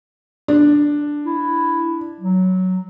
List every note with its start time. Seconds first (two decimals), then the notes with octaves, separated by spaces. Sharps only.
0.48 D4
1.26 E4
2.20 F#3